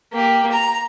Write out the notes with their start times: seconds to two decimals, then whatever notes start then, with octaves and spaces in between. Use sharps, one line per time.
0.13 A#3 G4
0.52 A#5